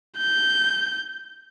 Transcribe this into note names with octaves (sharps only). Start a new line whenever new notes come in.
G6